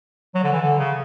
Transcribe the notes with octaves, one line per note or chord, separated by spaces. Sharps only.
F#3
D3
E3
D3
C#3